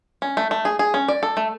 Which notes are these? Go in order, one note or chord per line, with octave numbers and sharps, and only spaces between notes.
C#4
A3
A3
G#4
G#4
C#4
D5
A4
A3